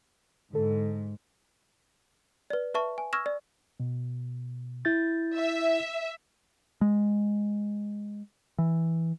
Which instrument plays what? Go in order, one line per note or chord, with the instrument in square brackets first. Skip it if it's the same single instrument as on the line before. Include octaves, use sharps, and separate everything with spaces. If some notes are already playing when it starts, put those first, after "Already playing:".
[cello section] G#2 [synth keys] D3 A4
[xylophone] B4 D5
B4 E5 A5 C#6
G#5
C#6 E6 F6 G#6 A#6 E7
D5
[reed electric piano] B2
E4 G6 A6
[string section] E5
[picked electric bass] G#3
E3